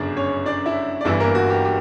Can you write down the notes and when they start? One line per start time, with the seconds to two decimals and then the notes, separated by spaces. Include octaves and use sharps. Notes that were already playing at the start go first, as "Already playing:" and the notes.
Already playing: G1 F#2 C#3 D4 D5
0.17 C#4 C#5
0.46 D4 D5
0.66 E4 E5
1.01 D5
1.05 G1 G2 E3 E4 E5
1.20 A#3 A#4
1.35 F#4
1.50 G4
1.65 G4